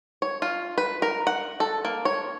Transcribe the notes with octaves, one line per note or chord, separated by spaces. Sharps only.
C#5
F4
B4
A#4
F#5
A4
A#3
C#5